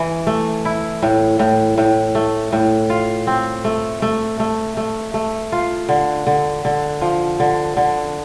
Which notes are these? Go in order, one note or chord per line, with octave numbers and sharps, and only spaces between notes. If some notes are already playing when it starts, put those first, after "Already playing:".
Already playing: E3
A3
E4
A2
A2
A2
A3
A2
F4
C4
A3
A3
A3
A3
A3
F4
D3
D3
D3
F3
D3
D3